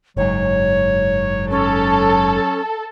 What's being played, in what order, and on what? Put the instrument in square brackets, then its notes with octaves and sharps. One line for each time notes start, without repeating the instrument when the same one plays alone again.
[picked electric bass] F#1 G#2 [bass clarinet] F#3 [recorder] C#5
[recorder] C#4 [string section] A4